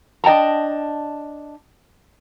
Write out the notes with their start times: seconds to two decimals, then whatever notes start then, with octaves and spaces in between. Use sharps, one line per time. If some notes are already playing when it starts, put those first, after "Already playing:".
0.24 D4 D#5 G5 A5 A#5